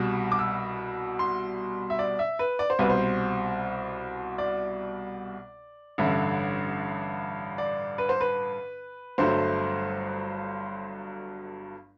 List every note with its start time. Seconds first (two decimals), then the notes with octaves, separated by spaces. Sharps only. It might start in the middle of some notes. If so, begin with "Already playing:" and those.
Already playing: C2 B2 G3
0.32 D6
0.39 E6
1.19 C6
1.90 E5
1.99 D5
2.19 E5
2.39 B4
2.59 D5
2.70 C5
2.79 C2 B2 G3 B4
2.90 C5
4.38 D5
5.98 A1 G2 D3 E5
7.58 D5
7.98 B4
8.09 C5
8.21 B4
9.18 G1 G2 F#3 A3 C5